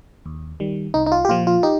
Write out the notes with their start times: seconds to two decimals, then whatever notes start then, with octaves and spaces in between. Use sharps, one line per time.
0.26 D#2
0.60 D#3 G3
0.94 C2 D#4
1.06 D#4
1.12 F4
1.25 G4
1.29 A#2 F3 F4
1.47 F4
1.63 D#4 G4